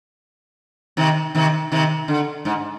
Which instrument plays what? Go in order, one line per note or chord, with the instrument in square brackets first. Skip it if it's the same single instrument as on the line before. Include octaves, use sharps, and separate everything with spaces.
[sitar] C3 D#3
C3 D#3
C3 D#3
D3
G#2